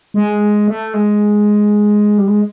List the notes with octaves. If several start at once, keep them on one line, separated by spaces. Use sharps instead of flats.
G#3
A3
G#3
G3
G#3